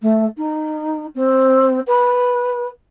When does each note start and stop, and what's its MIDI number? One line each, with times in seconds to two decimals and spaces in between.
0.02 0.25 57
0.37 1.06 63
1.15 1.79 60
1.86 2.67 71